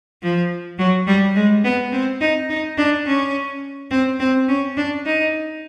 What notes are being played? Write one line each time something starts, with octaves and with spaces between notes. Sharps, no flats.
F3
F#3
G3
G#3
B3
C4
D#4
D#4
D4
C#4
C4
C4
C#4
D4
D#4